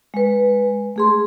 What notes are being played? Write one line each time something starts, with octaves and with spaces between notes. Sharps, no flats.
G#3 B4
A3 G#4 C6